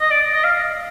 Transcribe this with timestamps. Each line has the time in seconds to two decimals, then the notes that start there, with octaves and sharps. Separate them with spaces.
0.01 D#5
0.11 D5
0.34 D#5
0.44 F5